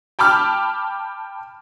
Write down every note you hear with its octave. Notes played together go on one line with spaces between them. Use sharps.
G5 A5 B5 D6 F6